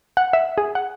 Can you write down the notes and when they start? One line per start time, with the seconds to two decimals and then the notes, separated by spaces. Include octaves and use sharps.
0.17 F#5
0.33 E5
0.58 G#4
0.75 F#5